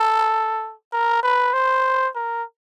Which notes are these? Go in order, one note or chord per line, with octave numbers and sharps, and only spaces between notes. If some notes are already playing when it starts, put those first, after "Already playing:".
Already playing: A4
A#4
B4
C5
A#4